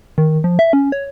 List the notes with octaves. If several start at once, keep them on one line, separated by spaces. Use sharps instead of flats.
D#3
F3
E5
C#4
C#5